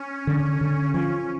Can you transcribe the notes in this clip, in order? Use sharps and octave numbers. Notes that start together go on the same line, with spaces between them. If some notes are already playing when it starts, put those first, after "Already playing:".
Already playing: C#4
D3
D3
F3 C#4